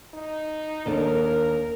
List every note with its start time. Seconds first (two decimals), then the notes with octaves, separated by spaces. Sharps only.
0.14 D#4
0.86 D#2 D4 A4 A#4